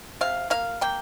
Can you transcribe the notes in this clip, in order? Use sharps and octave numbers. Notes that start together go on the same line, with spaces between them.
C3 F5
A#3 F5
A#3 G5